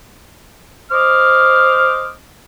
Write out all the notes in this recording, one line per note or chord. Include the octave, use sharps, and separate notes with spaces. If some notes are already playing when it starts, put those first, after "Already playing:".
C5 D#5 D6 F6